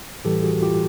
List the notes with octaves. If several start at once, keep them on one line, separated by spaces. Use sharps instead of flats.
A2 E3 G3 G4 A4
F#4 G#4
F4 G4